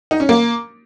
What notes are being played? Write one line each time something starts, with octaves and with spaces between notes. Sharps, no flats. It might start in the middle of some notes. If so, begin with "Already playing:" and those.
D#4
C#4
A#3